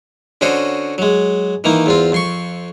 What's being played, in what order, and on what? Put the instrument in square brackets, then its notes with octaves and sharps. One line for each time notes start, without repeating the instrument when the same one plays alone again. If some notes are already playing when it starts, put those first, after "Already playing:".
[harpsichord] D3 C#4 F#4 C5 D#5
F#3 G#3
D#3 E3 A#3 D#4
E2 C4 F4
F2 C6 C#6